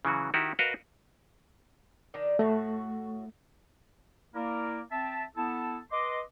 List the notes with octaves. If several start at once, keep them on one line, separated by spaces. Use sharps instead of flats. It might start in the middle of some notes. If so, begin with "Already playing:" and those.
C#3 E3 F#3 F#4
D#3 E4 F#4 G4
F#4 A#4 B4 D#5 F5
D#3 D4 D#4
A2 A3 F#4
A#3 E4 A#4 D5
C4 E5 A5
B3 E4 A4 A5
B4 D#5 C6 D6